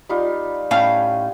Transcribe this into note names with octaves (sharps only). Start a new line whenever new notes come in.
G3 D#4 F4
A2 C#4 F5 G5